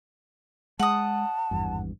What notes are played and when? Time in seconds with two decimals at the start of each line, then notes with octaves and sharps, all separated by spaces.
0.80 G#3 F#5 A5 D#6
1.51 G#1 E2 G2